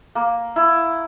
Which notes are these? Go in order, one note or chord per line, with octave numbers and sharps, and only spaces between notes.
A#3
E4